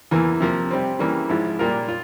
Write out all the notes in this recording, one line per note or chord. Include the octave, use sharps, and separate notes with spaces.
E2 E3 A#3
C3 F3 A#3
C3 G3 C4
C#3 E3 G3 A#3
G#2 F3 G#3 E4
A#2 G3 A#3 F4 A#4
F4